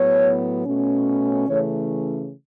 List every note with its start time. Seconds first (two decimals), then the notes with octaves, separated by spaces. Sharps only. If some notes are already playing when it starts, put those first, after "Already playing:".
Already playing: A2 F#3 B3 C#5
0.66 B2 A3 C#4
1.48 C#3 E3 A3 C#4 C#5